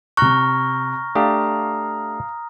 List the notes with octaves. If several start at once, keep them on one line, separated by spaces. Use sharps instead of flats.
C3 A#5 C#6 F6 F#6 A#6
A3 D4 G4 F5 A#5 D#6